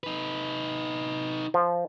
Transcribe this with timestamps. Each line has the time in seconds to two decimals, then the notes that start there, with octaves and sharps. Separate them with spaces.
0.04 D#4 B4
1.54 F3